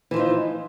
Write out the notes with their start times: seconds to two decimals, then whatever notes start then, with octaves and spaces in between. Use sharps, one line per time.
0.11 E3
0.14 F3
0.16 F4
0.19 D#4